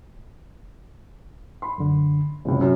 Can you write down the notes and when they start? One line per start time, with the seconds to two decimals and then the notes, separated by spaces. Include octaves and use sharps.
1.62 B5 C6
1.78 F#2 D3
2.45 F#1 C#2 C3
2.61 F#2